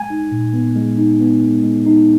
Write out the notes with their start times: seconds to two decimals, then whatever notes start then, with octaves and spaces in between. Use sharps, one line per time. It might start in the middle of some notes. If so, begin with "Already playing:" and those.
Already playing: G#3 G#5
0.10 D#4
0.32 A#2
0.53 B3
0.76 G#3
0.98 D#4
1.20 B3
1.42 G#3
1.64 G#3
1.86 D#4